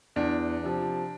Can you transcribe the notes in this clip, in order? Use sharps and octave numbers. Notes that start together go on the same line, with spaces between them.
E2 D4
C3 F3